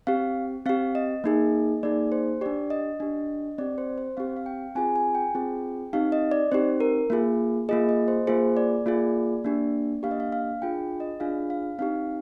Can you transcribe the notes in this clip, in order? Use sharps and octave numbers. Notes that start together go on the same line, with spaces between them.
C4 G4 F5
C4 G4 F5
D#5
A#3 D#4 G#4
A#3 D#4 G#4 D5
C5
D4 G4 D5
D#5
D4 G4
C4 G4 D5
C5
C5
C4 G4 F5
F5
G5
C4 F4 G#4 G#5
G#5
G5
C4 F4 G#4
C4 D#4 G4 F5
D#5
D5
C4 D#4 G4 C5
A#4
A#3 F4 G#4
A#3 F4 G#4 D#5
D#5
C5
A#3 F4 G#4 C5
D5
A#3 F4 G#4
A#3 D4 G4
A#3 D4 G4 F5
D#5
F5
F5
D4 F4 G#4 G5
D#5
D4 F4 G#4 F5
F5
C4 D#4 G4 F5